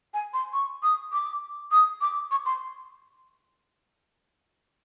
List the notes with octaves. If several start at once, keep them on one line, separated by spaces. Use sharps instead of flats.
G#5
C6
C#6
D#6
D6
D#6
D6
C#6
C6